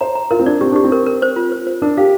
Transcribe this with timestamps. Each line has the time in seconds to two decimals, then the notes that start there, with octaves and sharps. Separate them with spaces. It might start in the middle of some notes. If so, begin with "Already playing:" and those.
0.01 C5 A#5
0.15 A#5
0.31 F4 A#4
0.39 C4
0.46 D4 D5
0.61 C4 G4
0.72 D4 G4
0.84 C4
0.92 A#4
1.06 A#4
1.22 C5
1.36 F4
1.52 C5
1.67 C5
1.82 D4 A#4
1.97 G4 F5